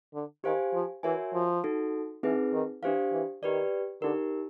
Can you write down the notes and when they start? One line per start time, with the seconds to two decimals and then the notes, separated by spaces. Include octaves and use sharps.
0.14 D3
0.44 D#3 G4 C5 F5 G#5
0.74 F3
1.03 E3 F#4 A#4 C#5 E5 G#5
1.34 F3
1.64 D#4 F#4 A4
2.23 E3 C4 D#4 G#4 B4
2.53 D#3
2.83 E3 D4 G4 C5 F5
3.12 E3
3.43 D#3 G4 B4 D5
4.02 D3 D#4 G4 A#4